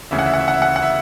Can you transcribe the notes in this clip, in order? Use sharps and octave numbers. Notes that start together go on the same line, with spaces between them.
D2 C#3 E3 E5
F#5
E5
F#5
E5
F#5
E5
F#5
E5
F#5
E5